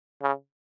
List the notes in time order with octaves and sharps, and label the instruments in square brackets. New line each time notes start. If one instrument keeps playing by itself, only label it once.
[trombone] C#3